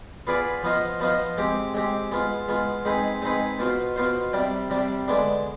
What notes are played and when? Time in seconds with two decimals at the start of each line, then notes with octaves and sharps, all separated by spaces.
0.27 B3 F4 G#4 B4 D5
0.63 F3 B3 F4 C5 D#5
1.00 F3 B3 F4 C5 D#5
1.38 G#3 C4 G4
1.74 G#3 C4 G4
2.12 G#3 B3 F4
2.48 G#3 B3 F4
2.85 G#3 C4 D#4 G#4 B4
3.22 G#3 C4 D#4 G#4 B4
3.59 B2 B3 F4 C5
3.96 B2 B3 F4 C5
4.33 C3 G3 D4
4.70 C3 G3 D4
5.08 D3 G#3 B3 D4